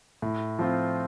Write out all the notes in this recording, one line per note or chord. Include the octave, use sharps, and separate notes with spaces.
A2
F3 C4 F4